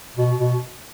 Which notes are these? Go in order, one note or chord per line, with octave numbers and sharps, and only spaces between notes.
B2
B2